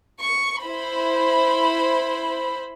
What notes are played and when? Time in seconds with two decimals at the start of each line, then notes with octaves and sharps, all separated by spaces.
0.22 C#6
0.62 E4 C5 B5